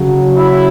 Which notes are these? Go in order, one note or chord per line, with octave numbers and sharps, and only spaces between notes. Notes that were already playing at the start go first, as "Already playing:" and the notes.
Already playing: C#3 F#3
E4